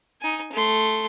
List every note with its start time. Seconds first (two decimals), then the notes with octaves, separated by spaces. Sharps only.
0.21 D#4 G#5
0.52 A3 C6